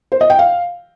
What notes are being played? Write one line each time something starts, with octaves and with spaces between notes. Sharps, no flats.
C5
D#5
G5
F5